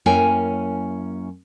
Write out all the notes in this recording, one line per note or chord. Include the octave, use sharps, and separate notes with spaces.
F#2 A#3 C#4 E4 G5 G#5